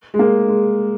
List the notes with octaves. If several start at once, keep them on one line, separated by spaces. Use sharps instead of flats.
G#3
A#3
G#3